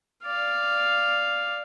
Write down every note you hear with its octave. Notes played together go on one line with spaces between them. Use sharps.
D5 F5